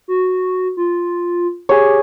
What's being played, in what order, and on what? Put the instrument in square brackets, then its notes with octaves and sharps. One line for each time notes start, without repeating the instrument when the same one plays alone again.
[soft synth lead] F#4
F4
[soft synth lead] G4 [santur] G#4 C#5